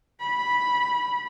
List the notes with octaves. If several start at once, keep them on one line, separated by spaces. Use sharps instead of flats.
B5